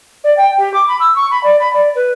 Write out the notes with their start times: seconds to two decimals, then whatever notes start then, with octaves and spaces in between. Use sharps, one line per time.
0.24 D5
0.37 G5
0.58 G4
0.74 D6
0.88 B5
1.00 E6
1.16 C#6
1.31 B5
1.43 D5
1.60 B5
1.73 D5
1.95 B4